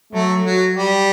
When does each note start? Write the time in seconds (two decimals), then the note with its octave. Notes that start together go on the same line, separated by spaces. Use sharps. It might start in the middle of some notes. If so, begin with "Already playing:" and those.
0.13 F#3 A3
0.45 F#3
0.75 G3